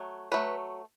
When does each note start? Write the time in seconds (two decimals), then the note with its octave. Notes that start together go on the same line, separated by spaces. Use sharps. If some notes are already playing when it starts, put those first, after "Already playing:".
Already playing: F#3 A3
0.32 F#3 A3 B4